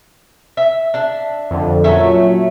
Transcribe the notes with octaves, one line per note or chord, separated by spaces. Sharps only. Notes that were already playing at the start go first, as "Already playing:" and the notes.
E5
D4 E5
F2 D3
A#2 F#3 A3 C#4 E5